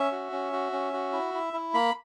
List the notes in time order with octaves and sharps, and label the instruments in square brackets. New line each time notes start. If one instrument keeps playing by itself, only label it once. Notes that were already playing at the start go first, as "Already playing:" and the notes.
Already playing: [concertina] C#4 E5
F#4
C#4
F#4
C#4
F#4
E4
E4
E4
A#3 B5